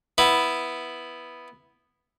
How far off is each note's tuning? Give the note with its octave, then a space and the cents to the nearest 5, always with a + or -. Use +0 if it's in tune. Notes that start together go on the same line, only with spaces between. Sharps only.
B3 +0 E4 +0